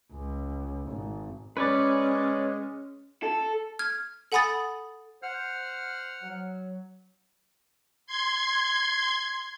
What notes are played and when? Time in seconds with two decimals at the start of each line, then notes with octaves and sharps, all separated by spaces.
0.12 C#2
0.89 G#1
1.57 G#3 C#4 B4 C#5 D5
3.23 A4
3.79 F6 G#6
4.32 A4 F#5 G#5 B5 D#6 A6
5.23 C5 F#5 F6
6.22 F#3
8.07 C6 G#6